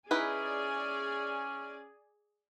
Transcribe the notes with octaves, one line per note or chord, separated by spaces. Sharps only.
C#4 D#4 E4 G#4 B4 D5 G#5